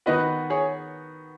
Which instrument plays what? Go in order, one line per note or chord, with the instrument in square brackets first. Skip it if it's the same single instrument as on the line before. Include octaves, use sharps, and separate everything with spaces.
[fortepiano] D#3 B3 F#4 [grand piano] B4 D#5
[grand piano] G#4 C#5